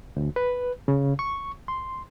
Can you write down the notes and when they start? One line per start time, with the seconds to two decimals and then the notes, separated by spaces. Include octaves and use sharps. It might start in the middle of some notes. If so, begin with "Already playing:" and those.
0.16 D2
0.36 B4
0.88 C#3
1.19 C#6
1.68 C6